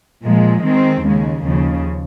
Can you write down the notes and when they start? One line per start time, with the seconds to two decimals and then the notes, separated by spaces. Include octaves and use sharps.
0.23 A#2 F3 G#3
0.64 D#3 G#3 C4
1.04 D#2 C#3 G#3
1.44 D#2 C#3 F3